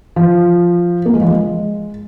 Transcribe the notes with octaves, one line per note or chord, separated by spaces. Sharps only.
F3
A#3
G#3
F3
G#3